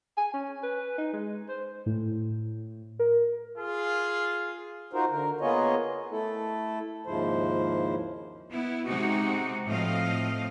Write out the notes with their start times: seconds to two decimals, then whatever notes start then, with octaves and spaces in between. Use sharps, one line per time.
0.17 G#5
0.34 C#4
0.63 B4
0.98 D#4
1.13 G#3
1.48 C5
1.86 A2
2.99 A#4
3.57 F4 G#4
4.93 D#4 F4 F#4 A#4 C5
5.10 D3 A#4
5.41 A#3 B3 F4 G#4 C#5 D#5
6.11 A3 E4 A4
7.06 D#2 G#2 C#3 F3 E4 C5
8.51 B3 E4
8.88 C3 G#3 D#4 F#4
9.65 A2 F3 A3 C4 D#5 F5